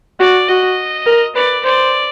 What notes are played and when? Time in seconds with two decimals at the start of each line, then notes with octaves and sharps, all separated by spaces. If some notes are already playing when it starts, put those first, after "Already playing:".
0.19 F#4 D5
0.48 F#4 D#5
1.06 A#4
1.35 B4 D5
1.64 C5 D5